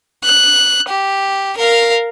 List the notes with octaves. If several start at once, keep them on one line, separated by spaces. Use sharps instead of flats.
F#6
G4
A#4 F5